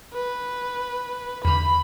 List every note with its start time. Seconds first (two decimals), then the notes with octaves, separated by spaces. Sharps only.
0.13 B4
1.45 E2 D3 B5